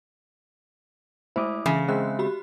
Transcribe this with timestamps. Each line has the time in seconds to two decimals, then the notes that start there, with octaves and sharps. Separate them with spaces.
1.36 G#3 A3 E4 C5 D6 D#6
1.66 C#3 E3 E5
1.88 G#3 C4 E5 F#6
2.19 F#4 G4 B5